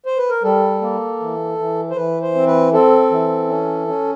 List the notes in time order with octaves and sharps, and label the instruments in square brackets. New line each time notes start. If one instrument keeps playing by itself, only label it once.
[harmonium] C5
B4
A#4
G3 A4
A#3
E3
E3
C5
E3 B4
C5
C4
B4
C4 A4
E3
C#4
C#4